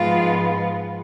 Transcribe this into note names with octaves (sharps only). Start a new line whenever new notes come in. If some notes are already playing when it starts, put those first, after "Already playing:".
Already playing: G#2 F3 G#3 B3 F4